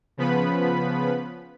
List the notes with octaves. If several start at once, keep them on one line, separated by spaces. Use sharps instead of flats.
C#3 F3 B3 B4 B5